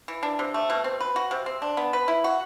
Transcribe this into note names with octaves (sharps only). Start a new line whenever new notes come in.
E3
D4
C3
A3
B2
C4
B4
F#4
C3
C4
D4
B3
B4
E4
F#4